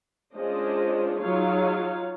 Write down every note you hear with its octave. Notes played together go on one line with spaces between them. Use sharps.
G#3 C#4 D4 F4 C5 D#5
F#3 D#4 F4 G#4 C#5 F5